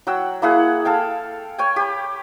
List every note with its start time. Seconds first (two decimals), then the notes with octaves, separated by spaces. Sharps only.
0.07 F#3 F#5 G5 E6
0.42 A#3 E4 G#4 F#5
0.85 A4 F5 G5
1.58 C#5 G5 G#5
1.76 G4 B5